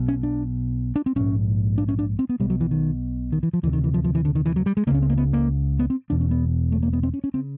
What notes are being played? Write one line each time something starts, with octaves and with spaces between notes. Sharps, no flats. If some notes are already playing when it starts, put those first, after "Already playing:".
Already playing: B1 B2
C#4
D4
D4
C4
A#1 G#2 C#4
D4
C#4
D4
C4
B3
B1 B2 G3
F#3
E3
D#3
D#3
E3
F3
D2 C3 E3
D#3
E3
F3
F3
E3
D3
D#3
E3
F#3
G3
G#3
C#2 C#3 A#3 C#4
C4
A#3
B3
A#3
B3
C4
E1 E2 B2 D4
C#4
B3
A3
A#3
B3
C4
C#4
C#4
C#3 C4